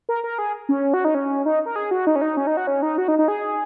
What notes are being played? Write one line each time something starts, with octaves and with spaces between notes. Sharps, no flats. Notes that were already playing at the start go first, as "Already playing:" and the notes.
A#4
A#4
G#4
C#4
F#4
D#4
C#4
D#4
A#4
G#4
F#4
D#4
C#4
D#4
C#4
D#4
F#4
C#4
D#4
F#4
D#4
D#4
G#4